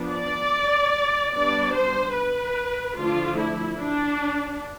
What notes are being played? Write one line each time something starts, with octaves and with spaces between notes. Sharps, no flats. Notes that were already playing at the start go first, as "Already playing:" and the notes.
Already playing: F3 B3 D4
D5
G3 B3 D4 D5
C5
B4
D3 F3 A3 D4 F4
E4
D4